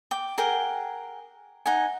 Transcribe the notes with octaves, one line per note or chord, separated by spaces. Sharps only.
G5 D6
G#4 A#4 F#5 G5
D#4 F#5 G#5